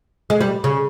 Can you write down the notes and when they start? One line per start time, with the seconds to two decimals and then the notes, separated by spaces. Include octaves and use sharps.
0.30 G#3
0.41 G3
0.64 C#3